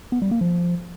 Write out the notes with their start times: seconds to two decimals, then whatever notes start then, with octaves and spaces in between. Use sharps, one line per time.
0.12 B3
0.22 G3
0.31 A#3
0.41 F3